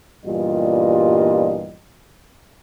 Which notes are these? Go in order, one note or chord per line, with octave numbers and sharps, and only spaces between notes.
E2 G2 A#2 G3 F4 D#5